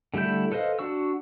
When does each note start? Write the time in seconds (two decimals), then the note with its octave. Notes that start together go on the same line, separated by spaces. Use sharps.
0.14 D3 G3 A3 E4 G6
0.52 A4 B4 C5 D#5 F5
0.79 D4 F#4 C#6 E6